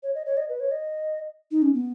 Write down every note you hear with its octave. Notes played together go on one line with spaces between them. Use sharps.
C#5
D#5
C#5
D#5
B4
C#5
D#5
D#4
C#4
B3